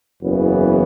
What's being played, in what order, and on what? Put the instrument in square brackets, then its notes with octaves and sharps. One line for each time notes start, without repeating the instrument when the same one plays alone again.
[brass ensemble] F#1 E2 C#3 E3 B3